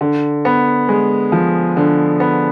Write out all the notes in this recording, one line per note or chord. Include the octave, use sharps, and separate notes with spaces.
D3
B3
G#3
F3
D3
B3